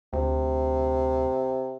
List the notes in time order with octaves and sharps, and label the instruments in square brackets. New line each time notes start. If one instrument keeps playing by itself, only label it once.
[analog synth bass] D2 [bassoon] C3